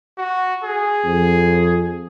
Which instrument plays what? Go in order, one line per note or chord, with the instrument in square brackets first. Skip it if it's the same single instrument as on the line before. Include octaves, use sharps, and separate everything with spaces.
[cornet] F#4
G#4
[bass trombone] F2